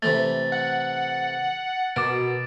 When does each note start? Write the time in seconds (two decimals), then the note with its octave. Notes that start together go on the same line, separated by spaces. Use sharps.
0.02 C3 E3 A3 A6
0.52 F#5
1.96 B2 A#4 D6 A6 D7